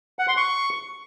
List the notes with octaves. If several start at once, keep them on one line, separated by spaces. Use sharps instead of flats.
F#5
C6
C#6